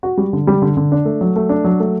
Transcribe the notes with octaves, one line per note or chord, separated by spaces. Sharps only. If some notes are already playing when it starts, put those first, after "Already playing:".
F#4
G3
D3
G3
D3
D3
D4
A3
F#3
A3
D4
F#3
A3